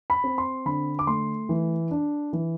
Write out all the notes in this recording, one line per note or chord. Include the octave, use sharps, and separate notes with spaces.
B5
C4
C6
D3 B5
D6
A3 C6
E3
D4
E3